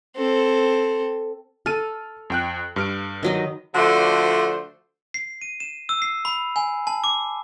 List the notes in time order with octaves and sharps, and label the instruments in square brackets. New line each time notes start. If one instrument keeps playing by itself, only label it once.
[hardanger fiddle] C4 A4
[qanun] A4 [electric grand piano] F6 D#7
[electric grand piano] F2 G5 F#6
G2 F6 D7
[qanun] D#3 F#3 D#5
[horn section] D3 F3 A3 F#4 C5 D5
[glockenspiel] C7
D#7
E7
E6
C7
B5
G#5
A5
D6